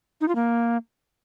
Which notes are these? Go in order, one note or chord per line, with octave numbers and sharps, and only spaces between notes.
D#4
F4
A#3